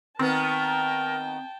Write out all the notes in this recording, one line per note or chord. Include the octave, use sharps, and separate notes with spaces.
D#3 B3 C4 A#4 G5 A5